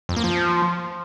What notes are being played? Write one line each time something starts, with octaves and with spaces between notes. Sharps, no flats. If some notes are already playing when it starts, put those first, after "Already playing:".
F2
A#3
F3